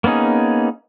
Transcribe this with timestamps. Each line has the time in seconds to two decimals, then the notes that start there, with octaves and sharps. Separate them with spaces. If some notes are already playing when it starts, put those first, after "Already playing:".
0.04 A#3 B3 C#4 D#4 G#4